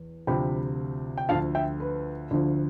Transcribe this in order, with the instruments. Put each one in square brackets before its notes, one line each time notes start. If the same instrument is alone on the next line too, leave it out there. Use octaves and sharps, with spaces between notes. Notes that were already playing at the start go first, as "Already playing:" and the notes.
Already playing: [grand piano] E2
D2 C3 F3 G5 B5
G5
D2 D3 F3 F5 A5
E5 G5
B4
D2 D3 F3